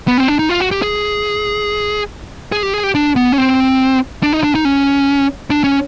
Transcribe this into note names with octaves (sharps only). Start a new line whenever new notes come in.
B3
C4
D4
D#4
F4
F#4
G4
G#4
G#4
G4
G#4
G4
D4
B3
C#4
C4
D4
D#4
D4
D#4
C#4
D4
C#4